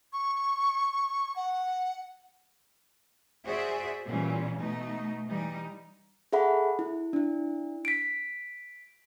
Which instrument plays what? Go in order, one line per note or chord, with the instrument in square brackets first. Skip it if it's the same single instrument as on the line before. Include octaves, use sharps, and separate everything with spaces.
[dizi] C#6
F#5
[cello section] F#4 G#4 C5 D5 E5
A#2 E3 G3 C#4
B2 A3 D#4
E3 G3 D#4
[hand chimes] G#4 A4 E5 F#5 B5
E4
D4 E4
B6 D7